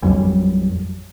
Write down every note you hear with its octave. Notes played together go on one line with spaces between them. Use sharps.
A1 F2 F#3 G3